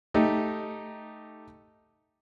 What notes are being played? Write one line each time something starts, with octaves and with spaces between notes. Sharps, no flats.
A3 D#4 G4